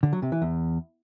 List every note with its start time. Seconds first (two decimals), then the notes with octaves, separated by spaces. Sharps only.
0.03 D3
0.13 F#3
0.22 C3
0.32 E3
0.42 E2